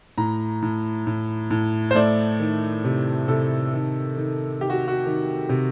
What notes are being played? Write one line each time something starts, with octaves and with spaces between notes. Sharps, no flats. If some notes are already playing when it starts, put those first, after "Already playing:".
A2 A#5
A2
A2
A2
C5
A3 D5
D#3
C3
C3 A4
D#3
D#3
D#3 G4
F#4
F#4
D#3
C3